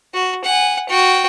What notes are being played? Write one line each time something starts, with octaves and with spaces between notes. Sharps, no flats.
F#4
F#5 G#5
F#4 G5